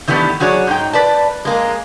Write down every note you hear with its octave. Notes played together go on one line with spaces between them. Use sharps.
D#3 E3 G3 A3 B3
F#3 F#4 G#4 C#5 D5
G#2 D#4 G5
B4 D5 A5
G#3 A#3 G#4